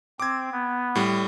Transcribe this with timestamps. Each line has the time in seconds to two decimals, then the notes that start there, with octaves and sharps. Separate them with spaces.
0.20 C4 D6 G#6
0.52 B3
0.95 A2 G3